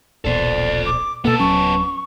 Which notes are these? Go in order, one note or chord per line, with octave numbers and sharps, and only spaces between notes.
D#1 A#1 B2 A4 C5 D5
D6
B2 A#3 B3 A4 A5
D1 F#3 C#4 C#6